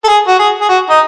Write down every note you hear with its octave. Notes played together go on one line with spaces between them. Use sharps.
A4
G#4
F#4
G#4
G#4
F#4
D#4